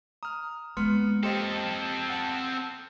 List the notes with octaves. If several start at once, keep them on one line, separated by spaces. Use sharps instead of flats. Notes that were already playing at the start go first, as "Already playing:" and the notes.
A#5 D#6 F6
G#3 A#3 B3 C6 F6 C#7
C4 G4 A4 C5 D#5
F#5 A5